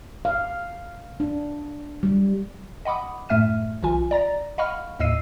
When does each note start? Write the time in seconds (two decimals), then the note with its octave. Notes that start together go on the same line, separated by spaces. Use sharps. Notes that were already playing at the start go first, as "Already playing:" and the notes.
0.25 F5
1.20 D4
2.03 G3
2.85 D#5 F#5 B5 D6 D#6
3.29 F#2 A2 A3 E5 F6 D#7
3.83 B1 E3 F4 G#5
4.11 D5 A#5 A6 A#6
4.58 D#5 F5 F#5 B5 C#6 F6
4.99 D#2 A2 D#5 E6 C7 D#7